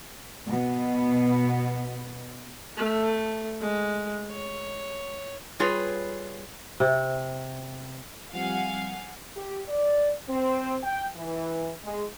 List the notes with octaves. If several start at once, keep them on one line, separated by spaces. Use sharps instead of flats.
B2 B3
A3
G#3
C#5
G3 F4 G#4 B4 C#5
C3
F3 G3 C4 F5 F#5 G#5
G4
D5
C4
G5
E3
G#3